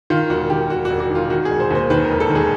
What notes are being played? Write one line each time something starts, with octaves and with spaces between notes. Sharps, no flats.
D#3 F4
E1 F#4
D#3 G4
E1 F#4
E1 F#4
F#4
D#3
F4
D#3 F#4
G#4
E1
C5
D#2 C5
D#3 B4
A#4
E1
A4
D#3
G#4